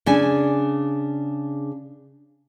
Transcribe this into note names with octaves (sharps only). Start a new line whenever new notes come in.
C#3 D4 G#5